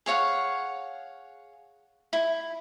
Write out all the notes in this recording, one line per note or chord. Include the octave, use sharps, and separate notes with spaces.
G#4 C#5 F5 F#5
E4